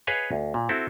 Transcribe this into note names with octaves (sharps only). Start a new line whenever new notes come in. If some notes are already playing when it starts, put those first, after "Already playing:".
G#4 B4 C#5 D#5 F5 G#5
D2
A#2
C4 E4 F#4 A4